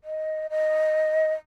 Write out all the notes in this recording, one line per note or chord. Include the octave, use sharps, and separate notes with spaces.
D#5
D#5